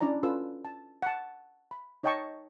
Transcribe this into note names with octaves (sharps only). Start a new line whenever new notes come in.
C#4 D4 E4 D5 A#5
C#4 F4 A4 B4 E6
A5
F#5 A5
B5
D#4 C#5 D#5 G5 A5 C#6